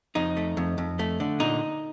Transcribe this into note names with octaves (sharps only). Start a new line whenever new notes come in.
F2 D#4
A3
F2
F2
A3
D3
A#2 D#4